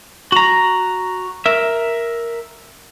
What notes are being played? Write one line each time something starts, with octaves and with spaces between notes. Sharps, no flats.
F#4 A#5
A#4 E5